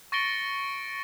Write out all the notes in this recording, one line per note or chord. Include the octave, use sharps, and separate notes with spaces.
C#6 A6 A#6 C#7 D7 G7